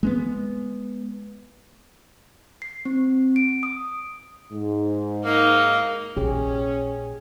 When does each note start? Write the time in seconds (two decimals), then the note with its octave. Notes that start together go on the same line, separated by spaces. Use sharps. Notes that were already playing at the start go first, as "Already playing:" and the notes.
0.03 G#3 A#3 B3
2.62 C7
2.85 C4
3.36 D7
3.63 D#6
4.52 G#2
5.25 A#3 D#4
6.17 A#1 C#4 G4 G#4 C#5